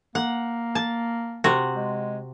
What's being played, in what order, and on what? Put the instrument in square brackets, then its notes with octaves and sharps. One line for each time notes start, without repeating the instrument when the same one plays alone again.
[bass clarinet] A#3 [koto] F#5
[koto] A5
C3 F#4
[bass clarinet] G#3